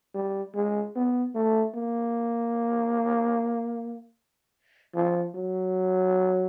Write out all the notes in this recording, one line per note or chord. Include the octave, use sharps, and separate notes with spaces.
G3
G#3
B3
A3
A#3
F3
F#3